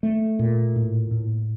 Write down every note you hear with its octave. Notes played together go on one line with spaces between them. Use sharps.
A3
A#2
A2
A2